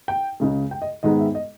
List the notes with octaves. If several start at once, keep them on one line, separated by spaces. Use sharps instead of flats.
G5
C#2 C#3 G#3
G5
D#5
G#2 D#3 G#3 B3 D#4 D#5
E5
D#5